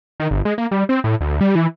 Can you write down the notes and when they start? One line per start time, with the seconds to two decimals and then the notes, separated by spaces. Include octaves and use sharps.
0.20 D#3
0.31 G1
0.45 G#3
0.58 A#3
0.71 G3
0.89 C4
1.04 A2
1.21 D2
1.41 G3
1.55 E3